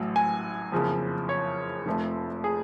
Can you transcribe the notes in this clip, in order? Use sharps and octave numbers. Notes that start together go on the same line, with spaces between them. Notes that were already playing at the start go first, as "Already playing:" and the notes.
Already playing: A1 A2 F#3
G#5
F#1 F2 C#3 F3
C#5
F1 F2 F3 A3
G#4